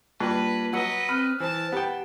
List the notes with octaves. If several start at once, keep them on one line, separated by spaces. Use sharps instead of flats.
G2 A#3 F4 B4 A5
F#3 B4 D#5 F#5 E6 C#7
C4 B5 F6 F#6
E3 C5 A5
B3 G4 F#5 G5